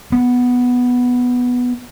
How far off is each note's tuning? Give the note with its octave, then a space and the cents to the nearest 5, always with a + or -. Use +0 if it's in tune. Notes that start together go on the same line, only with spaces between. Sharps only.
B3 +0